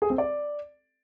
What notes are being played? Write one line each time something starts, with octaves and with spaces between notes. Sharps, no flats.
G#4
C4
D5